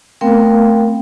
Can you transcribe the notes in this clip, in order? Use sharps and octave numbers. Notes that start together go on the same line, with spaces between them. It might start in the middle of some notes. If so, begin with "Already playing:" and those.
A3 B3 C4 A#4 F5 G5